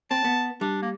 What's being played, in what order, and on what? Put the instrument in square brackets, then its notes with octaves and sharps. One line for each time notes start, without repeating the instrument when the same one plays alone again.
[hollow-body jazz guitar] C4 [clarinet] A5
[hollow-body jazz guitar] B3
[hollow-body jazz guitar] G3 [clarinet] D4
[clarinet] A#3